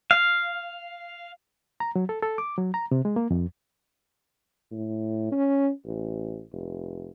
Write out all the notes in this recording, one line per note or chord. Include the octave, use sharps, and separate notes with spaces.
F5
A#5
F#3
A4
A4
D6
F#3
A#5
C3
G#3
A#3
F2
A2
C#4
A1
F1